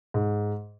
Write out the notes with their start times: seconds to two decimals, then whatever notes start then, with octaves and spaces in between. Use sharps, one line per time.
0.14 G#2